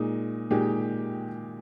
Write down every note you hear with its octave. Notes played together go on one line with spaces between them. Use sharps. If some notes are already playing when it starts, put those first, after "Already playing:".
Already playing: A#2 G#3 D#4
A#2 G#3 D#4 G4